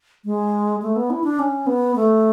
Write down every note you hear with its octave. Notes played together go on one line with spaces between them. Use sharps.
G#3
A3
B3
E4
D4
C#4
B3
A3